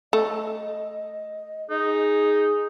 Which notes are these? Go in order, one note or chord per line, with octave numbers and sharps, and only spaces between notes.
A3 D#5
D#4 G#4